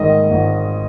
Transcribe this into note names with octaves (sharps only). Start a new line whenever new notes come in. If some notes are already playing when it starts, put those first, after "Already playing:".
Already playing: G#1 G#2 D#3 D#5
G#1